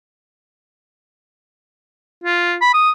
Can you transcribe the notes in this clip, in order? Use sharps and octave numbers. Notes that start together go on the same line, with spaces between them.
F4
B5
D#6